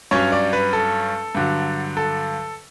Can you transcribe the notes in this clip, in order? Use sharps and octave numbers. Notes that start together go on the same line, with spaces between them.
G2 F#3 C#4 C#5
D5
B4
A4
G2 D3 F#3
A4